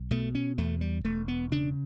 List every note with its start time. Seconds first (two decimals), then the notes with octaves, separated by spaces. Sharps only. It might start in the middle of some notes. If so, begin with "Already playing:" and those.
Already playing: B1
0.11 B2 A3
0.35 C#4
0.58 E2 A3
0.81 G3
1.05 E1 A3
1.28 B3
1.51 C#3 D4